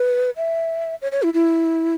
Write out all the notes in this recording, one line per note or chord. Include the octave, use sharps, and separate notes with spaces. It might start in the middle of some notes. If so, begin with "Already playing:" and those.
Already playing: B4
E5
C#5
C#5
E4
E4